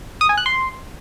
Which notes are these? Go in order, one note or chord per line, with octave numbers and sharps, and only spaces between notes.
D#6
G#5
F#6
C6